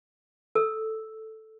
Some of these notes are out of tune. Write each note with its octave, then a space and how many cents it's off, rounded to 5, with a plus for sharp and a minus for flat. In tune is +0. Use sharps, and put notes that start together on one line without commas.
A4 +0 E6 +0